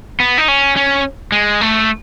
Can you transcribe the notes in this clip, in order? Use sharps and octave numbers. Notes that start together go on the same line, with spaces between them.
B3
D#4
C#4
C#4
G#3
A3